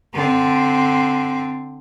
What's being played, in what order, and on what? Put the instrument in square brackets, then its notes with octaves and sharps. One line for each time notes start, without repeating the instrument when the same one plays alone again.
[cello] D3 C4